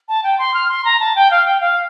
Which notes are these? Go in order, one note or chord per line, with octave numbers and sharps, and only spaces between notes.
A5
G5
C6
F6
C6
A#5
A5
G5
F5
G5
F5